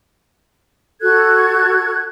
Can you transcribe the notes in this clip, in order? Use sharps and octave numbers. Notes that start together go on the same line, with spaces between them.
F#4 A4 F#6 G#6